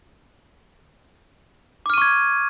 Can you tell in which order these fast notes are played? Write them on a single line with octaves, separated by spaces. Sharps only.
D6 F6 D#7 C#6 G#6